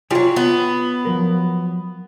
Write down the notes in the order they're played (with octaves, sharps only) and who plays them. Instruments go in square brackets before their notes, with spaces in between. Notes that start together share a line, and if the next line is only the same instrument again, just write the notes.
[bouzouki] F#3 G3 [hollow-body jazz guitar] F4 G5 G#5
[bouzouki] B3
[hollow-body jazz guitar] F3 F#3 A#4